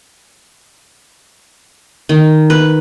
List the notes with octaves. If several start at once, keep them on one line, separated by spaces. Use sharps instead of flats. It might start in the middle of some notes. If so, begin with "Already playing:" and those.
D#3
B4